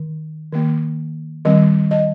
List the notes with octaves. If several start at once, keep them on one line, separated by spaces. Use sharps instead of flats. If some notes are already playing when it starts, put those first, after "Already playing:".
Already playing: D#3
D#3 A#3
D#3 G3 C4 D#5
D#5